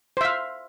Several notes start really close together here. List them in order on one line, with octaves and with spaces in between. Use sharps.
C5 E5 F5